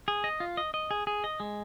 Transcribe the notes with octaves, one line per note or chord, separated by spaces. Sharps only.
G#4
D#5
F4
D#5
D#5
G#4
G#4
D#5
G#3